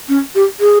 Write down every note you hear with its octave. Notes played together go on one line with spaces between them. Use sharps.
C#4
G4
G#4